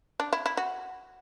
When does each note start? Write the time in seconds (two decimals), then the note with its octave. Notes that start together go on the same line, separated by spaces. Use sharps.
0.20 D4
0.33 E4
0.46 E4
0.57 F#4